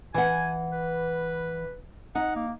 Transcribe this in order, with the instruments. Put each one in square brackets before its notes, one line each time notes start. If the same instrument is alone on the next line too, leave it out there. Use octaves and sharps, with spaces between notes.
[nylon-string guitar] E3 F#5 [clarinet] G#5
[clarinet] B4
[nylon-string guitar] D#4 [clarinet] F#5
[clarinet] A#3